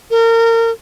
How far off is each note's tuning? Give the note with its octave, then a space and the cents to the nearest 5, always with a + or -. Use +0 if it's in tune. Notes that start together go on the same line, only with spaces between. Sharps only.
A#4 -30